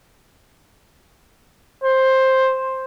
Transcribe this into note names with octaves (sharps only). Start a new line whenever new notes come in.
C5